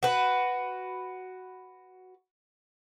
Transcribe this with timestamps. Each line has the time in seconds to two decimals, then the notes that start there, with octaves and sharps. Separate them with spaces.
0.03 F#4 B4